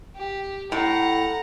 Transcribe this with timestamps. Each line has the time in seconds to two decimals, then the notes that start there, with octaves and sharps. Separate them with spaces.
0.16 G4
0.72 A2 F#5 A#5